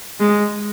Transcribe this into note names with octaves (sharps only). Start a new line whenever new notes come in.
G#3